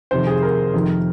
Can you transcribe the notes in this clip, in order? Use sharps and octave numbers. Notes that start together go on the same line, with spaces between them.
F2 C3 D#3 C5
G#4
A#4
F2 C3 D#3